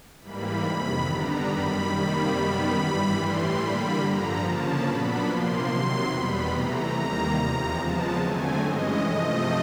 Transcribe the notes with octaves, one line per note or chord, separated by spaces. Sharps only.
G#2 E3 G3 A#3 B5
F2 C3 D#3 B5
D3 G3 B3 D4 A#5
F#2 D#3 G3 B5
C3 D#3 G3 A#3 B5
F#2 D#3 G3 B3 B5
G2 E3 G3 B5
A2 E3 G3 C6
D3 G3 A#3 B5
G2 D3 F3 A#5
C#3 F3 A#3 C#4 A5
A#2 F#3 B3 D4 B5
C3 F3 A#3 C6
C3 D#3 F#3
E2 B2 G3 B3 B5
C3 E3 A3 A#5
D#2 D#3 G3 A#3
E2 C3 F3 A#5
C#3 F3 G#3 B3 A5
D3 F#3 A3 C4 G#5
G2 E3 G#3 C#4 D#5
C3 F3 A3 D#5